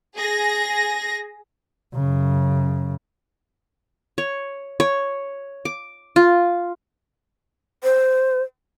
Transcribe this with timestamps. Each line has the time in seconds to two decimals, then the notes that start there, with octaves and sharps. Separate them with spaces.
0.19 G#4 A#6
1.94 F#2 C#3
4.18 C#5
4.80 C#5
5.65 D6
6.16 F4
7.84 C5